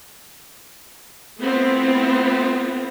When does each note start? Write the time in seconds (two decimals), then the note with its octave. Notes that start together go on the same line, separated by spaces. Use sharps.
1.38 A3 B3 C4 E4 F4